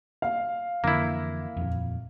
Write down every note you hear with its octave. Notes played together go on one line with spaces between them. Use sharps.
F5
F2 D3 E3 A#3 E4
D#1 G#1 F2